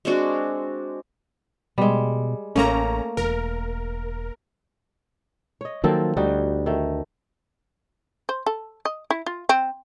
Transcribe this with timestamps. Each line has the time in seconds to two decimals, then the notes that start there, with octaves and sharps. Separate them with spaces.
0.05 G#3 C4 D4 F#4
1.78 B2 G3 G#3
2.56 A1 A3 A#3 C#4 A#5
3.17 E1 A#4
5.61 C#5 D#5
5.84 D#3 F3 F#3 A#3 C4 A4
6.17 D2 G3 D#4 F#4
6.66 D#3 A3
8.29 C5
8.46 A4
8.85 D#5
9.10 E4
9.26 F4
9.49 C4